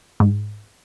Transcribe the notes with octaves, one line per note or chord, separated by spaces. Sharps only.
G#2